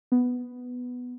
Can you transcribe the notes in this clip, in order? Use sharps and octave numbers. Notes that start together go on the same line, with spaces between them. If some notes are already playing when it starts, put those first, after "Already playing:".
B3